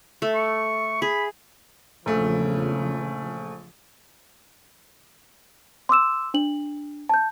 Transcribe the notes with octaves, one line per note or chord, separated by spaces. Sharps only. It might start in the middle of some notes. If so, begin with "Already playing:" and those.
A3
C#6
G#4 B5
A#1 E2 C#3 F3 A3
C6 D6 E6 E7
D4 F#7
A5 G6